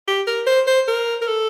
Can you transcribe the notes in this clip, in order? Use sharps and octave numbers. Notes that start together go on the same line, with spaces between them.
G4
A#4
C5
C5
A#4
A#4
A4